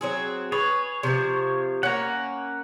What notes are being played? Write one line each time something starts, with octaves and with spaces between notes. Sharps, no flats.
F#3 C4 G#4
G#4 B4 C#5
C3 F3
A#3 C#4 F#5 A#5